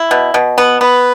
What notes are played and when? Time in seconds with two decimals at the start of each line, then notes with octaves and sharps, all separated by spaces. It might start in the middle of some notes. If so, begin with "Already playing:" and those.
Already playing: E4
0.11 B2
0.34 B2
0.58 B3
0.81 B3 B4